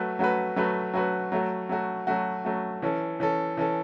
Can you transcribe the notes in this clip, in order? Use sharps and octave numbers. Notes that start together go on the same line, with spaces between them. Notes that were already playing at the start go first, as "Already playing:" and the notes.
Already playing: F#3 A3 F#4 B4
F#3 A3 F#4 B4
F#3 A3 F#4 B4
F#3 A3 F#4 B4
F#3 A3 F#4
F#3 A3 F#4
F#3 A3 F#4
F#3 A3 F#4
E3 C#4 A4
E3 C#4 A4
E3 C#4 A4